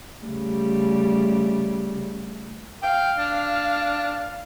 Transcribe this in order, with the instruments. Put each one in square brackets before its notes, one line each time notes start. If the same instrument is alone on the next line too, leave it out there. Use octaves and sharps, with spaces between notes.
[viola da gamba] C#3 G3 A3
[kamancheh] F5 [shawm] G5
[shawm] D4